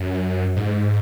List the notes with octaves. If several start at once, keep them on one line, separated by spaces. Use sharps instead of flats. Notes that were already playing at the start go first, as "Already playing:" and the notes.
Already playing: F#2
G#2